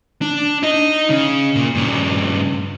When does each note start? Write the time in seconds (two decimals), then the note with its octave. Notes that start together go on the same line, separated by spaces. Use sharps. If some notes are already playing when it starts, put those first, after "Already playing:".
0.22 D4
0.63 D#4 D#5
1.10 C#3
1.56 A#2
1.75 G2 C#3